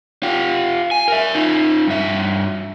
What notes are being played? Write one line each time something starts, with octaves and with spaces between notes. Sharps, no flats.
F4 G4
G#5
A#4 E5
D#4 F4
G2 E5